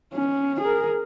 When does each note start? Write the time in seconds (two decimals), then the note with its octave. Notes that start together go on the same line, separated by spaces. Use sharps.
0.14 C#4
0.61 G#4 A#4